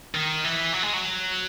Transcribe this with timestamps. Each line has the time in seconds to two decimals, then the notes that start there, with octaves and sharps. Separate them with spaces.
0.15 D#3
0.44 E3
0.73 F#3
0.83 G#3
0.94 F#3